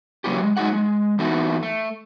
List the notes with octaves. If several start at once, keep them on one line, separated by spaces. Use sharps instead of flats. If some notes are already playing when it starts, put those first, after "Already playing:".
C#3 F#3 A#3 C#4 E4 G4
G#3
F#3 G#3 D#4 F#4 G#4 F#5
G#3
E3 B3 D#4 E4 F#4 A4
A3